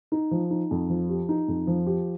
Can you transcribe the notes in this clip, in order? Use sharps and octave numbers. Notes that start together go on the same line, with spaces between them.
D#4
F3
D#4
F2
F3
G4
D#4
F2
F3
G4